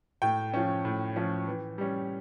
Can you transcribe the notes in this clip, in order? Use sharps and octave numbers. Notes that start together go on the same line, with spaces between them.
A2 G5
F3 C#4
A2
F3 C#4
E3
G3 C#4